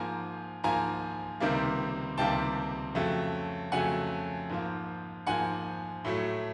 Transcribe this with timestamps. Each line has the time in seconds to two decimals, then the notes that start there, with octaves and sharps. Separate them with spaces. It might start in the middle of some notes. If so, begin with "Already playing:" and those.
Already playing: G#2 F3 A#3 G#5 A#5
0.64 G#2 F3 A#3 G#5 A#5
1.40 C#2 C3 D#3 G3 A#3
2.18 C#2 C3 D#3 G3 A#3 G5 A5
2.95 F2 C#3 F#3 A3
3.72 F2 C#3 F#3 A3 F#5 G#5
4.49 G#2 F3 A#3
5.27 G#2 F3 A#3 F#5 G#5
6.05 A2 F#3 A3